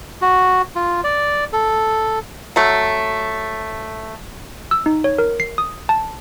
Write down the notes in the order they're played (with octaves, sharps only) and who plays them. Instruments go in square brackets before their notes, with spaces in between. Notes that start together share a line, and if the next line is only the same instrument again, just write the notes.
[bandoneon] F#4
F4
D5
A4
[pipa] F#3 A3
[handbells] E6
D#4
C#5
A#4
C7
D#6
A5